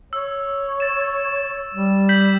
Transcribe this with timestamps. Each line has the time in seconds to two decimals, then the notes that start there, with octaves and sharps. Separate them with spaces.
0.13 C#5 E6
0.80 A6 E7
1.74 G3
2.09 G6 B6 F#7